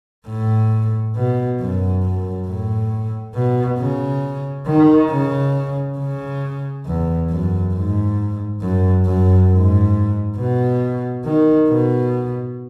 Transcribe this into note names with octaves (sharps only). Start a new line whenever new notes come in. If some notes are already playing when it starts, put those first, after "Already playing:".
A2
B2
F#2
F#2
A2
B2
C#3
D#3
C#3
C#3
E2
F#2
G#2
F#2
F#2
G#2
B2
D#3
B2